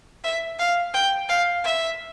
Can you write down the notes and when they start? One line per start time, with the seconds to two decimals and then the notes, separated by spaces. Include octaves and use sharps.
0.24 E5
0.59 F5
0.94 G5
1.29 F5
1.64 E5